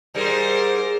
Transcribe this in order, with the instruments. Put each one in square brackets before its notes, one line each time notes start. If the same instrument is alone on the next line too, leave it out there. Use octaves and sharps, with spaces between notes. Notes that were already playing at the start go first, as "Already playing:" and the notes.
[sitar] G#2 G3 G#3 [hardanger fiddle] A#4 C5